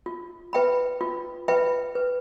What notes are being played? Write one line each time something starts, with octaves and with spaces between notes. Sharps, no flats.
F4
B4 E5 G5 B5
F4
B4 E5 G5 B5
B4